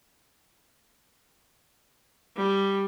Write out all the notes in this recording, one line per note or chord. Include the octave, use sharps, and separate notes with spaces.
G3